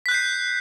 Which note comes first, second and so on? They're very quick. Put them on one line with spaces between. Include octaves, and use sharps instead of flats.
B6 F#6 G6 C7